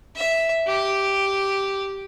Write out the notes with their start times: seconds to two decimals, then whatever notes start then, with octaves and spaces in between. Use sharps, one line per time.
0.16 E5
0.67 G4